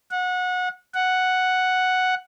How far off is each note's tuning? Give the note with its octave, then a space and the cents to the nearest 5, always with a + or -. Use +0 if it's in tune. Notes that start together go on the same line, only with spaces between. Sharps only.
F#5 -25
F#5 +0